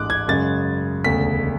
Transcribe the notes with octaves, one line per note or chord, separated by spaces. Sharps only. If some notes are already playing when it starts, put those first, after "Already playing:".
Already playing: A1 G#2 G#3 D6 F#6
G#6
F#2 C#3 G#3 A6
E1 D2 C#3 B6